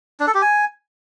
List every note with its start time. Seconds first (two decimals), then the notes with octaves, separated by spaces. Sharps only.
0.20 D4
0.27 A4
0.34 G4
0.42 G#5